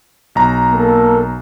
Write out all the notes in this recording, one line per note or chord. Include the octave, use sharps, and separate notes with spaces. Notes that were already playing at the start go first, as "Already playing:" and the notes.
B1 A#5
A#3 A4 A#4